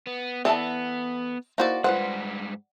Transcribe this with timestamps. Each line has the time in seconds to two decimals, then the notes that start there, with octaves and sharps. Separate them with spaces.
0.07 B3
0.45 E3 B3 A4 D5 E5 A5
1.58 A#3 D#4 E4 F#4 C5 D5
1.84 G#2 G3 F4 B4 C5 F#5